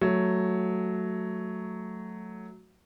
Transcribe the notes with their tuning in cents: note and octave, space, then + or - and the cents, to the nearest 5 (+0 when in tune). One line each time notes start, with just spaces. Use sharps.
F#3 +0 A3 -5